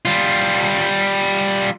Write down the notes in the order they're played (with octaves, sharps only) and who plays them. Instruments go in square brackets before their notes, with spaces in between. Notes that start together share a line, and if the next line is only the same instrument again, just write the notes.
[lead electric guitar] G3 F4